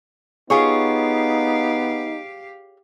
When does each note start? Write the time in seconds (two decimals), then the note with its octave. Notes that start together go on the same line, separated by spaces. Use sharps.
0.50 B3 D#4 F4 G4 G#4 C#5 F5